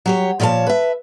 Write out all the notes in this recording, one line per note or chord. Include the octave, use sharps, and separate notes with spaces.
F#3 G4 C#5
A#2 F3 C#5 F5 A5
B4 E5